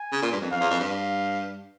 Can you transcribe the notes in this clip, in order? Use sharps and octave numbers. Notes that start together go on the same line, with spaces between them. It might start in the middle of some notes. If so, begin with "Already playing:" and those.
Already playing: G#5
C#3
A#2
G2
F2
F2 F5
E2
F2
G2
F5